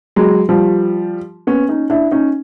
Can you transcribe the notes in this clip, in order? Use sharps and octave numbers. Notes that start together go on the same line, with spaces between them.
F#3 G#3
F3 G3
B3 C#4
C#4 D#4
D4 E4
C#4 D#4